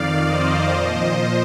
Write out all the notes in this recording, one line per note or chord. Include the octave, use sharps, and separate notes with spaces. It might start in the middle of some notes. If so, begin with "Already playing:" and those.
Already playing: F2 D#3 D5 F5
C5 D#5
A#2 F3